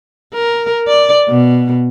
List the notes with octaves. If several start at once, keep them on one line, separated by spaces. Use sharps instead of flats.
A#4
D5
B2